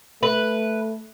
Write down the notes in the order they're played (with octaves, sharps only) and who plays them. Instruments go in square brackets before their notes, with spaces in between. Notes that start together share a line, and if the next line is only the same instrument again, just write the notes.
[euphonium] A3 [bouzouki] B4